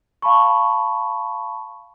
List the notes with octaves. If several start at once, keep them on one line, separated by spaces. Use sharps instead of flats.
F5 A5 B5 C#6